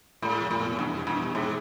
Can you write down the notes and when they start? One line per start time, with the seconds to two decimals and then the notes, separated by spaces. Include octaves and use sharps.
0.22 A2 G#3
0.41 F1
0.51 A2
0.60 B2
0.79 E2 G2
0.97 E2
1.07 G2
1.17 B2
1.35 G#2 G#3